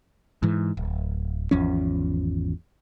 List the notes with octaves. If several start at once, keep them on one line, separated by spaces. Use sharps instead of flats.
G#2 E3
D1
G#1 E2 F3 C#4